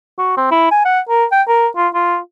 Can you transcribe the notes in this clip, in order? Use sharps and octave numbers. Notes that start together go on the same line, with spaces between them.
F#4
C4
E4
G#5
F#5
A#4
G5
A#4
F4
F4